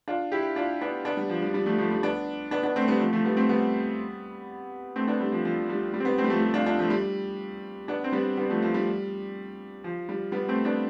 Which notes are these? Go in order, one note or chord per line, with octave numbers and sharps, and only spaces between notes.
D4 F4
E4 G4
D4 F4
B3 D4
B3 D4
G3
F3
G3
G3
F3 A3
F3 A3
G3
B3 D4
B3 D4
B3 D4
A3 C4
G3 B3
F3 A3
F3 A3
G3 B3
A3 C4
G3 B3
A3 C4
B3 D4
G3
F3
F3
G3
G3
C4
G3 B3
A3 C4
G3
F3 A3
G3
D4 F4
D4 F4
F3 A3
G3
B3 D4
C4
G3 B3
G3 B3
F3 A3
F3
G3
F3
G3
G3 B3
A3 C4
B3 D4